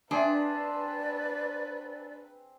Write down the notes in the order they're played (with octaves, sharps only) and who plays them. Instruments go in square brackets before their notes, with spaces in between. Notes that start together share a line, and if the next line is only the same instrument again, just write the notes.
[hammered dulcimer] C4 G#4 E5 [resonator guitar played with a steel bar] D4 [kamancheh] B4 [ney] D5